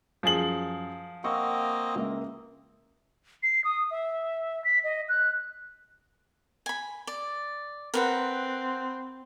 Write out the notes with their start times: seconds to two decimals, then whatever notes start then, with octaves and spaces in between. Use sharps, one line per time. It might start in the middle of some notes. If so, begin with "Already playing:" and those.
0.23 F#2 F3 G#4 F#7
1.24 A#3 C4 D#5 F#5 C#6 E6
1.95 C#2 A#3 E5
3.43 C7
3.64 D#6
3.91 E5
4.64 B6
4.84 D#5
5.09 F#6
6.66 G#5 B5
7.07 D5
7.94 C4 A#4 B4 F#5